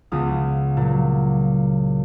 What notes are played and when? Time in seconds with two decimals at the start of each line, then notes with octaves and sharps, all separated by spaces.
0.12 C#2 C#3 B3 F4 D#6
0.77 A#2 F#3